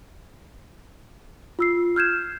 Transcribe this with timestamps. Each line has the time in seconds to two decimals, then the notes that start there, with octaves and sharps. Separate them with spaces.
1.59 F4 E6 C7
1.96 F6 G6 G#6 E7